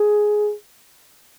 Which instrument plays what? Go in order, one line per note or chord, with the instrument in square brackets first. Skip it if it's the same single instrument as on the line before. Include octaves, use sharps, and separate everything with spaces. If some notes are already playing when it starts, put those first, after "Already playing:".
Already playing: [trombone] G#4